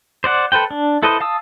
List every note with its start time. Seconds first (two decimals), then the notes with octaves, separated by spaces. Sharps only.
0.24 C5 D5 F#5
0.52 A4 B4 C5 G5
0.71 D4
1.03 E4 A4 B4 C5 D#5
1.20 F5 A5 D#6 E6